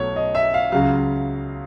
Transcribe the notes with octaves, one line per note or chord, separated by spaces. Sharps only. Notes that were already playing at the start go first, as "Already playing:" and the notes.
Already playing: B1 B2 F#3 A3 C#5
D#5
E5
F5
C#2 C#3 F#3 F5